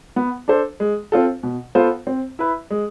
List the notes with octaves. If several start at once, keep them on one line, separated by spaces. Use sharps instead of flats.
B3
D4 A4 C5
G#3
C4 F4 A4
B2
B3 F4 A4 C5
C4
E4 B4
G#3